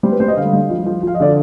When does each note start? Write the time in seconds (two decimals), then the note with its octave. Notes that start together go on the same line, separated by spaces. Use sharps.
0.03 G3 C5
0.12 B4
0.20 G3 C5
0.28 D#5
0.37 D3 F5
0.53 G3
0.70 F3
0.86 F3
1.03 F3 F5
1.14 D#5
1.20 D3 D5